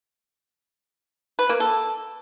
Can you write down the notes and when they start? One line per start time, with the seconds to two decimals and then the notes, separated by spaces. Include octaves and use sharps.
1.39 B4
1.49 A#3
1.60 A4